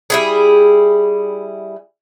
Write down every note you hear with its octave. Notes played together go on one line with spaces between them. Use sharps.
G3 E4 G#4